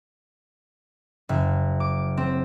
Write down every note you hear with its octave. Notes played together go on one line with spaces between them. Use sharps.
F#1
D6
C4